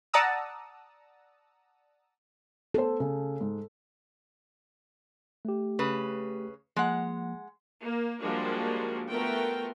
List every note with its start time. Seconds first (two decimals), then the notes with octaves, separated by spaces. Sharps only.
0.14 D5 F#5 A5 A#5 D#6 E6
2.74 B3 A4 C5
3.00 C#3
3.41 G#2
5.45 A3 G4
5.79 C#3 B4
6.76 F3 G#3 A#3 F#5
7.82 A#3
8.21 F3 G3 G#3 A#3 D4 F#4
9.08 A3 B3 F4 F#4 A#4 G5